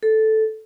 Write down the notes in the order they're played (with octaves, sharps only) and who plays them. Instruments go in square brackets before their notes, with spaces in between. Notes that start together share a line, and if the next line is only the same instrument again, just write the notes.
[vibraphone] A4